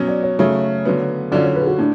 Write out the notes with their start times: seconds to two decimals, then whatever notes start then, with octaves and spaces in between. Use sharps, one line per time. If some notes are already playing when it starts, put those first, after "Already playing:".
Already playing: B2 F#3 C#4
0.08 D5
0.23 C#5
0.39 C#3 F#3 A3 C#5
0.85 D3 F#3 B3
1.32 D3 F#3 C#4 F4 D5
1.44 C#5
1.56 B4
1.61 G#4
1.67 F#4
1.79 A2 D4